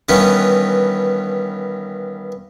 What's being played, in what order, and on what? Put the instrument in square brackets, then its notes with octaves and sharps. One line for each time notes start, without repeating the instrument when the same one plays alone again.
[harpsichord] G2 D#3 E3 B3 C#4